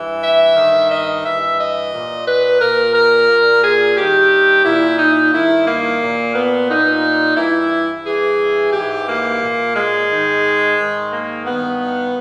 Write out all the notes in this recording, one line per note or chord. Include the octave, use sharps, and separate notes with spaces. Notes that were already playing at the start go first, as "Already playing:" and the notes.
Already playing: G2 E3
E5
G2 D#3
D#5
G2 E3 E5
D#5
A#2
B4
A#2 A#4
A#4
A#2
G#4
G2 D#3 G4
A#2 E4
D#4
G2 D#3 E4
A#3
A#2
B3
A#2 D#4
G2 E3 E4
G2 E3 G#4
G#2 E3 G4
A#3
A#2
G#3
G#2 D#3
G#2 D#3
A#3
G2 D#3 B3